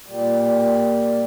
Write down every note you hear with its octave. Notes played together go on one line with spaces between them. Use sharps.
A#2 G3